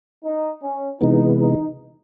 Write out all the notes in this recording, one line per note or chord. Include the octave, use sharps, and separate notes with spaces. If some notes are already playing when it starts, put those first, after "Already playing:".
D#4
C#4
C3 E3 G#3 B3 D#4
D#4